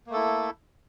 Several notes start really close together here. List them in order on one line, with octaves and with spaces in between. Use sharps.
A#3 A3 A4 E4